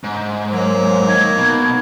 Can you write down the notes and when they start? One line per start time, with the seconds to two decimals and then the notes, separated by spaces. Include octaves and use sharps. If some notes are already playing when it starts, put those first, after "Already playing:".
0.04 G#2
0.51 F#3 A#3 C5
1.08 D#4 A#4 G#6
1.38 B2 D#4